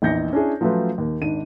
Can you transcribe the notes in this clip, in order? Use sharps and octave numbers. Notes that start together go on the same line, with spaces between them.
A#1 E2 D#4 G6 A#6 C#7
C#4 D4 E4 G#4
F3 F#3 A3 C#4 F4 B4
D#2
G#1 G#2 D4 D#7